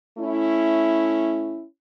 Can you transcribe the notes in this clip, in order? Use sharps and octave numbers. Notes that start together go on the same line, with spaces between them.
A3 C#4 E4